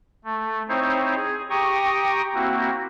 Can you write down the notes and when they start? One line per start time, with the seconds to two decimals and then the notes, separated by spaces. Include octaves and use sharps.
0.24 A3
0.68 C4 D#4 E4 C5 C#5
1.16 G#4
1.50 G4 G5 A#5 C#6 D#6
2.34 A#3 C4 E4 F#4